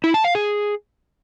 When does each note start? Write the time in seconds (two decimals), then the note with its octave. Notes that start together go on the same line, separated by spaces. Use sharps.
0.04 E4
0.14 A5
0.25 F5
0.35 G#4